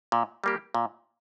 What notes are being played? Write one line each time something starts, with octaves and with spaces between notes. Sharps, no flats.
A#2
G3 A#3 G4
A#2